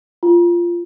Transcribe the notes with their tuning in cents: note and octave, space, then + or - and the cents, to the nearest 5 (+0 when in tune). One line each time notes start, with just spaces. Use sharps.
F4 -15